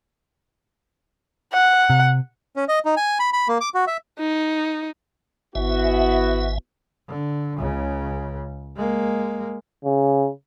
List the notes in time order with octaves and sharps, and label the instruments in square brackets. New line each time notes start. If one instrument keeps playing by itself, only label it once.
[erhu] F#5
[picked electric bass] C3
[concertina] C#4
D#5
D#4
G#5
B5
B5
A#3
D6
F#4
E5
[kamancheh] D#4
[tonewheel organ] G#1 E5 [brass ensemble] B3 E4 F#4
[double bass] D3
C#2 C#3
G#3 A#3
[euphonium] C#3